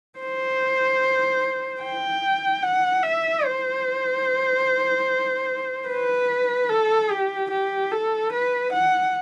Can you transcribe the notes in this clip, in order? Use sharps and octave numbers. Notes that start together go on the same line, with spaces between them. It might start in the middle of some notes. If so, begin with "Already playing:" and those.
C5
G5
F#5
E5
C5
B4
A4
G4
G4
A4
B4
F#5